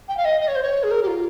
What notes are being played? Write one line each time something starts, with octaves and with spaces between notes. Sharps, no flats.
G5
F5
D#5
D#5
C#5
C5
C#5
G#4
A#4
G4
F4